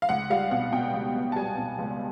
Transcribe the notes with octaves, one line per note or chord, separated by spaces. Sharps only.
F5
C#2 F#5
G3 F5
B2 F#5
B2 G5
C#2
C#2
A5
G3 G#5
B2
C#2